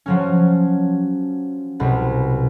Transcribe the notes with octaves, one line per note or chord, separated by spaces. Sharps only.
F3 F#3 C#4
C2 B2